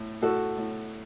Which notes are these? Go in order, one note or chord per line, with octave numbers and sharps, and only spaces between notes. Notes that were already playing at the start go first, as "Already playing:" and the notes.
Already playing: A2
A2 F#4 A4
A2